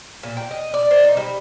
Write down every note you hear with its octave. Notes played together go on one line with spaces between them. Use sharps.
A#2
G5
D#5
D5
C5
D#4
G3